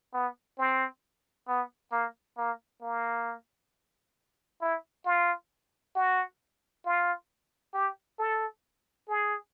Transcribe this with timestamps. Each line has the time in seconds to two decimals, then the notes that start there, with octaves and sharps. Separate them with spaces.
0.13 B3
0.58 C4
1.48 B3
1.92 A#3
2.38 A#3
2.81 A#3
4.61 E4
5.05 F4
5.96 F#4
6.85 F4
7.74 G4
8.19 A4
9.08 G#4